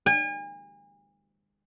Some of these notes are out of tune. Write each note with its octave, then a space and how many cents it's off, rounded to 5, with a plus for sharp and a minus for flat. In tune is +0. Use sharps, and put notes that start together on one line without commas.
G#5 -40